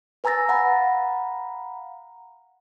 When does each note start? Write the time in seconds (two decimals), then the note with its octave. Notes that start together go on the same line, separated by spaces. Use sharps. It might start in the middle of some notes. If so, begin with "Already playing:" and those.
0.24 B4 G#5 A#5 E6 A6 A#6
0.49 F5 F#5 A#5 B5